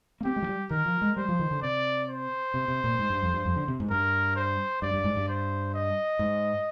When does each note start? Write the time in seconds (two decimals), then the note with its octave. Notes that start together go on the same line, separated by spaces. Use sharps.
0.21 A#3
0.25 C4 G4
0.36 G#3
0.42 F3
0.47 G3
0.71 D#3 A#4
0.86 F3
1.02 G#3
1.17 G3 C5
1.29 F3
1.39 D#3
1.51 D3
1.62 C3 D5
2.09 C5
2.54 C3
2.68 C3
2.84 A#2
2.99 G#2
3.10 G2
3.23 F2
3.33 G2
3.45 F2
3.56 D3
3.68 C3
3.80 G#2
3.90 G2 A#4
4.36 C5
4.82 G2 D5
4.94 G2
5.04 G#2
5.16 G2
5.28 C5
5.74 D#5
6.19 G#2